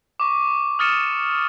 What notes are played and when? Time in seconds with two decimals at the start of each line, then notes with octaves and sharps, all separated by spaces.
0.20 C#6 D6
0.79 D#6 F6 A6 C#7 D#7 E7